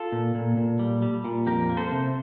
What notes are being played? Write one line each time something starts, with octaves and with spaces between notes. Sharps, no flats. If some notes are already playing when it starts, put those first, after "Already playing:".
Already playing: F4 A4
A#2
A#2
A#2
G3
G3
A#2
F2 G4 A#4
A#3
A4 C5
C3